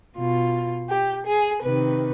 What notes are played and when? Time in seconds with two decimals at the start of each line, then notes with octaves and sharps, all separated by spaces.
0.17 B2 F4
0.89 G4
1.26 G#4
1.62 C3 D#3 B4